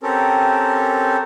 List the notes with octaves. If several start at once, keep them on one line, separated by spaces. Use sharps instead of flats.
C4 C#4 G4 A4 A#4